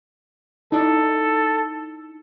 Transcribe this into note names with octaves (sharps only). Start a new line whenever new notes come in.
D#4 E4 A4 D5